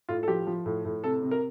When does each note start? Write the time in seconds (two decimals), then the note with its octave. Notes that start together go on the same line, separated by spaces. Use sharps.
0.09 A2 F4
0.23 A4
0.28 F3 G4
0.47 F3
0.66 A2
0.85 A2
1.04 C3 A4
1.23 C3
1.31 A#4